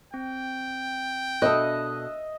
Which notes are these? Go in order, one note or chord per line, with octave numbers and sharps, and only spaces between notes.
C4 G5
B2 D4 A4 D#5 E5 D#6 F#6